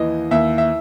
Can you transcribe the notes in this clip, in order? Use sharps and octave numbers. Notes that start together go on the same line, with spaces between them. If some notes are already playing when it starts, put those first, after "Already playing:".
Already playing: D#2 E3 D#5
D#2 E5
E5